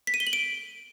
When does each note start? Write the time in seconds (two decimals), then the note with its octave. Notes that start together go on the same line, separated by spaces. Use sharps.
0.07 B6
0.14 D#7
0.20 G7
0.27 F#7
0.33 D7